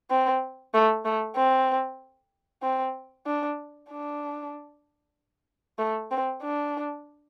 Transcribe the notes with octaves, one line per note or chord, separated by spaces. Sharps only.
C4
A3
A3
C4
C4
D4
D4
A3
C4
D4